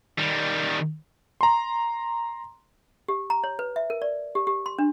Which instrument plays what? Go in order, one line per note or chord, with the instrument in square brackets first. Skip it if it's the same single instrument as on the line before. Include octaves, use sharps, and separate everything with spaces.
[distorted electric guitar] D#3 G3
[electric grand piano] A#5 C6
[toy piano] G4
A#5
C#5
B4
E5
A#4
D5
G4
G4
C6
D4